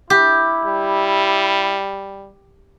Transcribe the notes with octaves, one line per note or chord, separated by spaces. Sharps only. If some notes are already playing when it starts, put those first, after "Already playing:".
E4 G4
G3